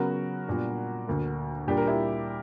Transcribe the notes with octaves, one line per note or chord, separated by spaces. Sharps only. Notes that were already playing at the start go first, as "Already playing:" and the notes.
Already playing: C#3 F#3 B3 F#4 A#4
A#2 G3 B3 D4
D2 D3 A#3
A#2 G3 A#3 D4 G4
A#4
E4 G4